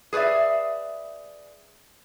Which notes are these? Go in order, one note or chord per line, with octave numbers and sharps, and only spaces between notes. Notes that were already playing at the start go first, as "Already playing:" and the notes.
G#4 B4 C#5 D5 E5